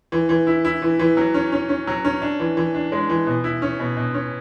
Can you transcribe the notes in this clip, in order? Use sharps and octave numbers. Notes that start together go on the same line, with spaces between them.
E3
E3
E4
E4
E3
E3
F#3
C#4
C#4
C#4
F#3
C#4
D4
E3
E3
D4
G#3
E3
B2
E4
C#4
B2
B2
C#4